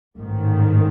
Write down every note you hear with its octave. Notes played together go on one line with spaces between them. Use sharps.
A1 G#2 D#3